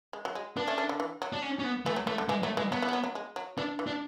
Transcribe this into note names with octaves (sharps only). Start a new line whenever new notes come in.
G#3
F#3
G#3
B3 D4
A3 C#4
A3 C#4
D3
E3
F#3
D4
C#4
C#4
B3
E3 A3
F#3
E3 A3
D3
E3 G#3
F#3 A3
E3 G#3
F#3 B3
E3
G#3
F#3
F#3
G#3
F#3
E3 D4
E3
D4